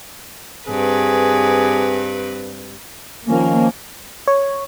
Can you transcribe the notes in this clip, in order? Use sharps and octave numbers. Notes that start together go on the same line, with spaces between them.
G2 C4 G#4 B4
D#3 F3 A#3 C#4
C#5